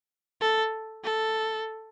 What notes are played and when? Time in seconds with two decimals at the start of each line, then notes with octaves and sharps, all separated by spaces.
0.41 A4
1.04 A4